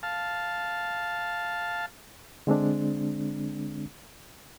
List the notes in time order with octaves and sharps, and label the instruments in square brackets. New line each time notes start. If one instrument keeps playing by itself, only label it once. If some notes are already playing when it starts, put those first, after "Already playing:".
[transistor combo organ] F5 A5
[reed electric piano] D3 G#3 C4 D4